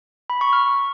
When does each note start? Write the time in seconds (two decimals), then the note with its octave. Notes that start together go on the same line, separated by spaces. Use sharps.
0.30 B5
0.41 C#6
0.53 F6